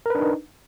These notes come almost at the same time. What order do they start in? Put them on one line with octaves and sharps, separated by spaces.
A#4 B4 D4 D#4